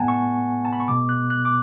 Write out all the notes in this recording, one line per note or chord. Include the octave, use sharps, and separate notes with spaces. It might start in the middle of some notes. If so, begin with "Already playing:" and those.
Already playing: A2 G#3 B3 F#5 G#5 A5
C#6
A5
B5
C#6
B2 G#3 B3 D6
F#6
F#6
D6